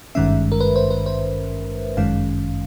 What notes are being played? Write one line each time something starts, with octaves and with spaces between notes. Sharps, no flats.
G#1 G2 D#3 G#3 C#4 E5
A#4
B4
C5
B4
C5
G1 F#2 D#3 G#3 C#4 F5